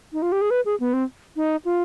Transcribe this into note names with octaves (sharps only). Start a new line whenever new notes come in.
D#4
F4
G4
G#4
B4
G#4
B3
C4
D#4
F4